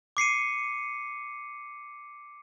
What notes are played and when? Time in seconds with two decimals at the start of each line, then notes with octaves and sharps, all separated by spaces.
0.17 D6 C7 C#7 D#7